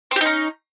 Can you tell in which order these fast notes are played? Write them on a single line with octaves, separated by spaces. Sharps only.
C4 G4 D#4 C#4